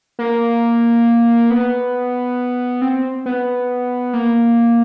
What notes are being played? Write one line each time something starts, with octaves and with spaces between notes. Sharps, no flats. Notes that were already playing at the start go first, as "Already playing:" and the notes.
A#3
B3
C4
B3
A#3